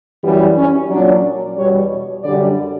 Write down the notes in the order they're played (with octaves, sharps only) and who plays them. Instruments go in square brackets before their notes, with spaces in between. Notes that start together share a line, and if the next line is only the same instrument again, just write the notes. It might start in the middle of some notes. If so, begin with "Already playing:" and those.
[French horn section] F#2 E3 G3 B3
C#4
A#2 F#3 D4
E2 B2 G3 C#5
F#2 D3 G3 D5